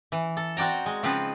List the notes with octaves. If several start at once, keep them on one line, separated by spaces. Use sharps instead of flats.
E3
A4
C4 F#4 D5 G5 A#5
G#3
C#3 F3 C4 D#4 F4 B4